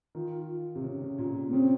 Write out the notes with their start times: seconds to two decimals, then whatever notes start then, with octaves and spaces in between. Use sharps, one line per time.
0.15 D#3 F4
0.75 C3
0.84 C#3
1.01 C#3
1.18 A#2
1.48 A#3
1.53 C#3 C4